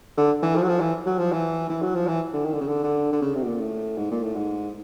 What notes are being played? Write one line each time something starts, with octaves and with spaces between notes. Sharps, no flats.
D3
E3
F3
F#3
F3
E3
F#3
F3
E3
E3
F#3
F3
E3
D3
D#3
D3
C#3
D3
D3
D3
C#3
C3
B2
A#2
A2
G#2
A#2
A2
G#2